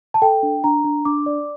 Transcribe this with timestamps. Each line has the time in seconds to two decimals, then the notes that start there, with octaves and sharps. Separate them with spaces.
0.14 A5
0.22 A4 G5
0.43 D4
0.64 D4 A#5
0.84 D4
1.05 D4 D6
1.26 D5